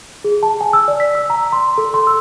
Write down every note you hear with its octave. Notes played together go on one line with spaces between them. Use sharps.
G#4
A5
G#5
E6
D5
B6
E6
A#5
C6
A4
C6
E6